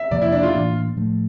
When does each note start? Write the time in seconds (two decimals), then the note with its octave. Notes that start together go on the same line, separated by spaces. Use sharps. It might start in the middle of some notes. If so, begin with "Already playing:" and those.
Already playing: E5
0.11 F2 C3 F3 A#3 D5
0.22 E4
0.32 D4
0.43 F4
0.54 A2 E3 A#3 D4
0.97 A2 F3 A3